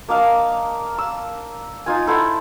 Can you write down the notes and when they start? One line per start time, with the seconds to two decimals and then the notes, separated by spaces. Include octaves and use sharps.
0.09 A#3 D4 D#5 F5
0.98 E6
1.86 D#4 F4 G#5
2.07 E4 A4 C5 F#5